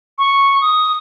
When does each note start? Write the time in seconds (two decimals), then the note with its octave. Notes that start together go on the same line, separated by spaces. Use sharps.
0.18 C#6
0.61 D#6